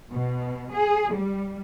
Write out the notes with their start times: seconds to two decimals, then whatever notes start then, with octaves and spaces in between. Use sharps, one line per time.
0.10 B2
0.73 G#4
1.13 G3